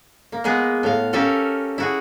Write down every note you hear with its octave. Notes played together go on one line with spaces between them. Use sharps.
A#3
G#3 A#3 B3 G#4
A2 F5
C#4 G4 A4 A#4 E5 F5
E4 F#4 G#4